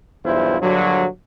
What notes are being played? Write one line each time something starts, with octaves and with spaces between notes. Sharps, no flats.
B1 E2 G2 E4 F4 C5
A#1 G2 D3 F#3